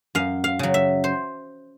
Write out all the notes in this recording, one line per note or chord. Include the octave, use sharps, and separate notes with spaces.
F#2 F5
F5
C#3 F#3
E5
C5